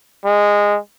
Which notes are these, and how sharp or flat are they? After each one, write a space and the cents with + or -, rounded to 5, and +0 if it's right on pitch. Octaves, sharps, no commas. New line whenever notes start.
G#3 -15